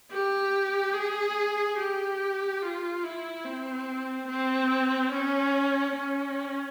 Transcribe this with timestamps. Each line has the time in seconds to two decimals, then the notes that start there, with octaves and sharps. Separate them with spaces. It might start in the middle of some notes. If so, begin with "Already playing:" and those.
0.11 G4
0.95 G#4
1.78 G4
2.62 F4
3.04 E4
3.45 C4
4.28 C4
5.12 C#4
5.96 C#4